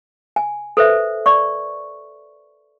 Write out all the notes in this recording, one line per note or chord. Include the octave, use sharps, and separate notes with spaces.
G#5
A4 B4 C5 E5
D5 C#6